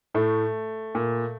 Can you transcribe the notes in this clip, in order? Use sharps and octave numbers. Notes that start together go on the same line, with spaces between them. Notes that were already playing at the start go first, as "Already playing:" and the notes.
A2 A3
A#2